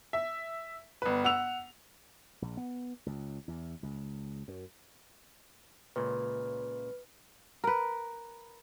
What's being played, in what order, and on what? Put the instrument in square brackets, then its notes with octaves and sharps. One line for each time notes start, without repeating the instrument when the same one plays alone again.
[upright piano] E5
G1 B4
F#5 E6 F7
[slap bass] A#1
B3
C#2
E2
C#2
F#2
[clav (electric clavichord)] C#2 A#2 C#3 [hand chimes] B4
[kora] A#4 B4